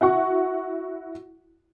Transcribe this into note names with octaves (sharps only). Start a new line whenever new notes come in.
E4 F#4 F#5 C#6